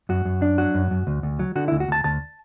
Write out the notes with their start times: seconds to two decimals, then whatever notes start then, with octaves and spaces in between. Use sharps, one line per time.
0.09 F#2 F#4
0.25 F#2
0.42 D4
0.58 F#3 F#4
0.75 F#2
0.91 F#2
1.07 D2
1.23 D2
1.39 F#3
1.55 D3 F#4
1.68 E4
1.72 D2
1.80 F#4
1.88 D2 A5
2.04 D2 A5